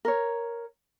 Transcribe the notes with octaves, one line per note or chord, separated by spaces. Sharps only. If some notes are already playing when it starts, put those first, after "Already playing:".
A#4 C#5